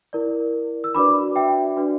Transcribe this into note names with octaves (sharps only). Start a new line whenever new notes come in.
E4 A#4 D5
E6
D4 F#4 B4 D5 B5 D6
E5 G5
D4 F#4 B4 D5